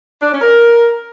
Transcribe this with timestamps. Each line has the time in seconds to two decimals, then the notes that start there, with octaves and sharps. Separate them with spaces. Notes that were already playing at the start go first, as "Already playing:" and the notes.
0.21 D4
0.31 C#4
0.41 A#4